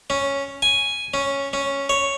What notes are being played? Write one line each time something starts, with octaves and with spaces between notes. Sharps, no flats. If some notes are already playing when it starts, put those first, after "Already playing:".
C#4
G#5
C#4
C#4
C#5